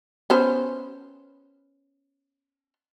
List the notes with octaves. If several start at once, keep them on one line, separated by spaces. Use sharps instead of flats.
B3 C#4 C5